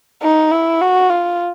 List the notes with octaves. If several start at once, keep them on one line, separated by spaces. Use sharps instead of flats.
D#4
E4
F#4
F4